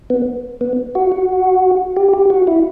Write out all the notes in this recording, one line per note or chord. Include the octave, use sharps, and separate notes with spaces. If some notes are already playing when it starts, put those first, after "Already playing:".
B3
B3
F#4
F#4
G4
G4
F#4
E4